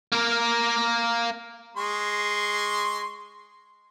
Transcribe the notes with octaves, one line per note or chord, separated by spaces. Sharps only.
A#3 A#4
G#3 C6 C#6